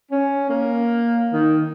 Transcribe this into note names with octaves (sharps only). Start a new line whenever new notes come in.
C#4
A#3
D#3